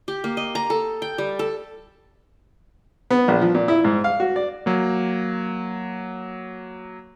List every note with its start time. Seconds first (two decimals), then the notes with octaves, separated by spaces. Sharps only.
0.08 G4
0.24 A#3
0.37 D#5
0.55 A#5
0.70 A4
1.02 G5
1.18 G3
1.39 A4
3.11 B3
3.28 A#1
3.42 F3
3.55 A#2
3.68 E4
3.85 G#2
4.04 F5
4.20 F#4
4.36 D5
4.66 F#3 A#3